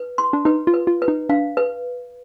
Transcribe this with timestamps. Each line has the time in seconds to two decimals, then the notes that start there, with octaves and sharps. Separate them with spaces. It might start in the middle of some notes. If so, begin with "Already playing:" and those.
Already playing: B4
0.18 C6
0.33 D4
0.45 D#4 B4
0.67 F4
0.74 B4
0.87 F4
1.02 B4
1.08 D#4
1.29 D4 F5
1.57 B4